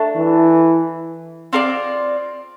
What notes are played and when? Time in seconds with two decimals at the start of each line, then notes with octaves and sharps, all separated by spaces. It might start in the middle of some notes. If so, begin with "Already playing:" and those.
Already playing: A3 D4
0.16 E3
1.53 C4 F4 A#4 D5